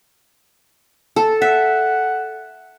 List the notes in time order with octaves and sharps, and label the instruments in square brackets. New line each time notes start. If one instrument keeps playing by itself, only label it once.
[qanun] A4
[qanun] E5 [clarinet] F#5